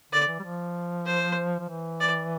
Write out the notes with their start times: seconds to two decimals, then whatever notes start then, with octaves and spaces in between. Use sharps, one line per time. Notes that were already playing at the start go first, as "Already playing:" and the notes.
0.13 D3 D5
0.28 E3
0.39 G3
0.43 F3
1.06 C5
1.59 F3
1.69 E3
2.00 D5